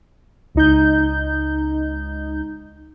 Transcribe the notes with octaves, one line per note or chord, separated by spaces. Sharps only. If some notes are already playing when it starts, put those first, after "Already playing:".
C#2 D#4 G6